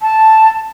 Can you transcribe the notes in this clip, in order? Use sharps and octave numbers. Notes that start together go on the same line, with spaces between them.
A5